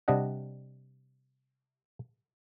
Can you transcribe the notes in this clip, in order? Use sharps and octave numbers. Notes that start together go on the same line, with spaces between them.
C3 G3 D4 D#5 F#5